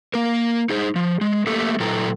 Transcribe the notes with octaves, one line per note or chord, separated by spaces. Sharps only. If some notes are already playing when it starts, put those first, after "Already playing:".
A#3 A#4
D#4 G#4 C5
F3
G#3
A3 A#3 G4 A4 E5
A#2 F#3 E4 A4 G5 A#5